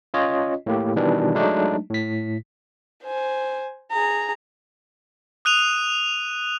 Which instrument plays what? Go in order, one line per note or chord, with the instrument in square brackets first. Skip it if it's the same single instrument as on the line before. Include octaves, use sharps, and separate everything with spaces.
[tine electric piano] C#4 F4 C#5 D#5
A2 A#3 G4
B2 D#3 E3 G3 D4
F#3 G#3 A3 D4 D#4
A2 B6
[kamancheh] C5 G#5
G#4 A#5
[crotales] D#6 F#6 D#7 F7